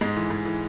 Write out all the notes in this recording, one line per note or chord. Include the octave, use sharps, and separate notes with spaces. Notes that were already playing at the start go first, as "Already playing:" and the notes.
G#2 G#3
E3
G#2
E3